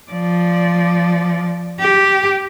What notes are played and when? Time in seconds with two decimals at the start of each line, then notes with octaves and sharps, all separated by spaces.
0.12 F3 D5
1.80 G4